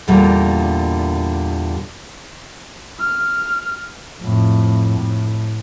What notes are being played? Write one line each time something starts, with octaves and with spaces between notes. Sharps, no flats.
E2 A#2 D3 G3 A#3
F6
F2 A2
A2